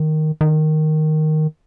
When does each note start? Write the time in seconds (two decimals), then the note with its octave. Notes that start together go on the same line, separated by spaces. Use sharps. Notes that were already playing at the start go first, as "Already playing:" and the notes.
Already playing: D#3
0.41 D#3